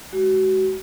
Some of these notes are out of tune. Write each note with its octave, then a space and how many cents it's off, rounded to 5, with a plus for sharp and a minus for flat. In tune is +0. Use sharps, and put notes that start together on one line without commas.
G#3 +0 F#4 +35